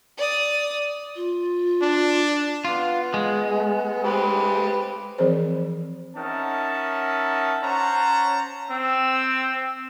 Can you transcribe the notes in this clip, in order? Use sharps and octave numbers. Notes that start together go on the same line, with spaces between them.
D5 D#6
F4
D4
B3 F4
G#3
G4 B4 C5
E3 F3 C4 G#4 A#4 C5
C#4 D#4 A#4 E5 F#5 A5
C#4 C5 C#5 F#5 A5 A#5
C4 E6